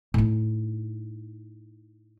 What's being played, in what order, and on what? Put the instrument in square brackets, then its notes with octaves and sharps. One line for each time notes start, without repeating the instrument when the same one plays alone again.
[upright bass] A2 D#4